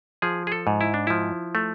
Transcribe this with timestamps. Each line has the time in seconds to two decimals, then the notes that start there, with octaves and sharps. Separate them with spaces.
0.22 F3 G#4
0.47 G#4
0.52 A4
0.67 G#2
0.81 E4
0.94 D4
1.07 F3 E4
1.55 A3